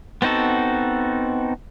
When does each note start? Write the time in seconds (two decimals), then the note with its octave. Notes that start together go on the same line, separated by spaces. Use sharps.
0.22 B3 C4 D#4 F#4 A4